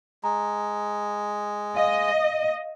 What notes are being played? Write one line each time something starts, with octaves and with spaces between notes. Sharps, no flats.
G#3 A#5
D#5 F5